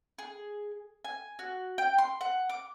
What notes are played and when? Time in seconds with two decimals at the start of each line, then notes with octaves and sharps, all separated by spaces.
0.18 G#4
1.05 G#5
1.39 F#4
1.78 G5
1.98 C6
2.21 F#5
2.49 D6